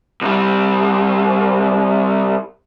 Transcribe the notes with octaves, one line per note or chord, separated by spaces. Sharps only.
C2 G3